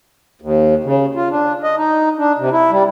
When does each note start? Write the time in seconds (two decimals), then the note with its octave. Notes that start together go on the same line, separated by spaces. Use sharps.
0.42 D#2
0.84 C#3
1.15 F4
1.31 D4
1.63 D#5
1.78 D#4
2.18 D4
2.39 C3
2.52 E4
2.71 G3